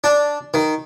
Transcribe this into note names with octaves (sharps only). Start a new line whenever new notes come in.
D4
D#3